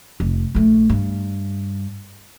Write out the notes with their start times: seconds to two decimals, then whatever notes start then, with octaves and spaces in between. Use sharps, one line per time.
0.20 F1
0.55 A#1 A3
0.89 G2